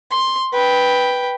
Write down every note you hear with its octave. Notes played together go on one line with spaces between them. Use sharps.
C6
B4 G5